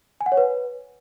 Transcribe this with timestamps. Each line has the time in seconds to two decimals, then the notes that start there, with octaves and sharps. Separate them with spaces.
0.21 G#5
0.26 F#5
0.32 C#5
0.37 B4